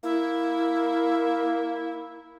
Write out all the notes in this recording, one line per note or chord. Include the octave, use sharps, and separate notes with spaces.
A#3 E4